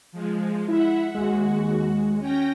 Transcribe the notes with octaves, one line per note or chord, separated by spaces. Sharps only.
F3 G#3
E4 E5 F#5
D#2 G#3 F#4
C#4 G5 A#6